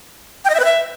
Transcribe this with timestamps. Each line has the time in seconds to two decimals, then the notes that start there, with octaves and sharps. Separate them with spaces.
0.45 G5
0.50 D#5
0.55 E5
0.60 B4
0.65 E5